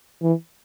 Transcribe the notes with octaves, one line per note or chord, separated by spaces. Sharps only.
E3